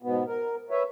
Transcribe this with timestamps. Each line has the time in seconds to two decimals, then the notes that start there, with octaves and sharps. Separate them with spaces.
0.03 G#2 B2 B3
0.27 A#4
0.70 B4 C#5 E5